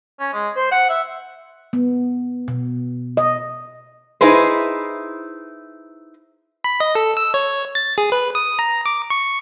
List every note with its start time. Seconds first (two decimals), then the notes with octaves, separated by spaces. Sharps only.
0.20 C#4
0.34 G#3
0.57 C5
0.72 F#5
0.90 E5
1.73 B3
2.48 B2
3.17 D#5
4.21 D#4 E4 G#4 B4 C5
6.64 B5
6.80 D#5
6.95 A4
7.17 E6
7.34 C#5
7.75 A6
7.98 G#4
8.12 B4
8.35 D#6
8.59 A#5
8.86 D6
9.10 C#6